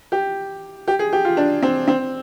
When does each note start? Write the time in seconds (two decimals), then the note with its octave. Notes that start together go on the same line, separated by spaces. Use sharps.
0.12 G4
0.88 G4
0.99 G#4
1.13 G4
1.25 F4
1.37 D4
1.62 C4
1.87 C4